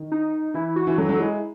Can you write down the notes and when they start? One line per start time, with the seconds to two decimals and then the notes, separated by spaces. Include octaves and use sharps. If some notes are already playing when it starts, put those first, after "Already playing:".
Already playing: D#3
0.12 D#4
0.54 E3 E4
0.76 F#4
0.87 E3
0.98 F#3 A4
1.09 F#3
1.20 G#3 E4